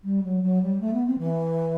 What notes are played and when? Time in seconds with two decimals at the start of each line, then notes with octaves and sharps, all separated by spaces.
0.04 G3
0.23 F#3
0.43 F#3
0.62 G3
0.80 A3
0.93 B3
1.06 C4
1.18 E3